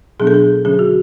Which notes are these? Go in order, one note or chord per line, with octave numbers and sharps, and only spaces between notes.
B2 F#3 B3 D4 G#4
A4
G#4
D3 F#3 C#4 G#4
F#4